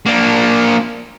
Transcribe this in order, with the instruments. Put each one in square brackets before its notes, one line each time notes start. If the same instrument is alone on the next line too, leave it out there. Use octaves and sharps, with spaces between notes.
[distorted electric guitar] A#3 D4